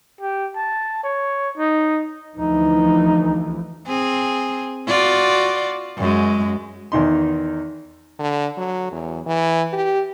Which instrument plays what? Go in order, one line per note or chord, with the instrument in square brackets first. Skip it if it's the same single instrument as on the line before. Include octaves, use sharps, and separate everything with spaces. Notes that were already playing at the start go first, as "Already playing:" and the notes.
[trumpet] G4
A5
C#5
D#4
[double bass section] D2 E3 F3 [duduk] D#4
[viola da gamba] C4 G#4
F4 F#4 D5
F#2 G#3
[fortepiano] E2 D#3 D#4 C6
[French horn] D3
F#3
E2
E3
G4